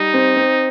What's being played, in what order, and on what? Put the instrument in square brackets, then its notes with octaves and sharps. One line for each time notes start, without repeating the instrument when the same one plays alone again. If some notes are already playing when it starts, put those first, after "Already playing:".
Already playing: [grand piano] G3 [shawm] D#4
[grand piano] C4
C4